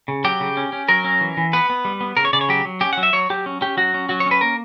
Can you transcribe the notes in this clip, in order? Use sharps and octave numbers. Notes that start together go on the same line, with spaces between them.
C#3
F#3 G4
C#3
C#4
C#4
F#3 A#4
C#4
E3
E3
B3 B4
B3
G3
B3
C#3 A#4
C#5
C#3 D5
C#5
F#3 G4
F#3
C#4 G4
F#5
F#3
E5
F#3 C#5
F#3 G4
C#4
C#4 G4
F#3 F#4
C#4
F#3 F#4
C#5
C#4 B4
A#3 A#4